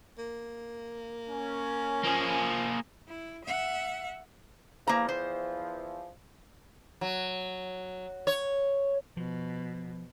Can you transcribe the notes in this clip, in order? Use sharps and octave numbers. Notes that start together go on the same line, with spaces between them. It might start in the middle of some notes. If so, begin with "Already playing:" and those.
A#3
C#4
F3 A#3 G#4
E4
E5 F#5
E2 E3 F3 A#3 A#5
C5
F#3
C#5
B2 F3